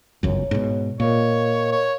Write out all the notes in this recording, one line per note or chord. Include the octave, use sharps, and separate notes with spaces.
G1 C#2 F#2 C#5
G#2 B2
A#2 A#4 C#5 D#5 F5
C#5